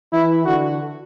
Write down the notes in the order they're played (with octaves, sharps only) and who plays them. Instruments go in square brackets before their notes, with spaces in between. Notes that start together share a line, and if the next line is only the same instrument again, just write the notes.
[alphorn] E3 [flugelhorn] E4
[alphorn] D3 [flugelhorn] F#4